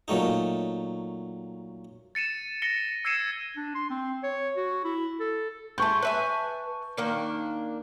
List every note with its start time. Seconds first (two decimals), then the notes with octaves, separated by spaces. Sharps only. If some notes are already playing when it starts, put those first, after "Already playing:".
0.08 A#2 F#3 A3 D#4
2.15 A6 C#7 D#7 E7
2.62 A#6 C#7 G7
3.05 E6 G#6 C7 C#7 D#7 E7
3.57 D4
3.75 C6
3.90 C4
4.23 C#5
4.57 F#4
4.84 E4
5.20 A4
5.78 G#3 A3 A5 C#6 G6
6.03 B4 E5 G#5
6.97 D#3 A#3 D4